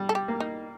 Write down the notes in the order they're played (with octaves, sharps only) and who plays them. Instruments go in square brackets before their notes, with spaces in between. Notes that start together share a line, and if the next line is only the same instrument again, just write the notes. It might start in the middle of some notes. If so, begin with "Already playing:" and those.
Already playing: [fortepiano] G3
[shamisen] A4
G4
[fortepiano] A#3
[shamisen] D#4